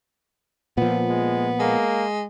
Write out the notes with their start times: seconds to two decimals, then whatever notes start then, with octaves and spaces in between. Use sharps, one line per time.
0.77 A#2 F3 B3
1.09 G#3
1.60 G#3 A#3